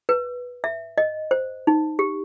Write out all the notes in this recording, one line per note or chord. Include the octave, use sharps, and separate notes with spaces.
B4
E5
D#5
C5
D#4
G4